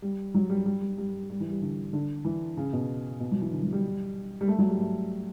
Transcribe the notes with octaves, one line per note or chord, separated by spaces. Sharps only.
G3
F#3
G3
G3
G3
G3
G3
E3
G3
D3
D3
E3
C#3
B2
B2
F#3
E3
D3
F#3
G3
G3
A3
F#3
G3
A3